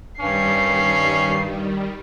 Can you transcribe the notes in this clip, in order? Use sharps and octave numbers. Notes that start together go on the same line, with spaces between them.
G2 D#3 G3 C#4 C7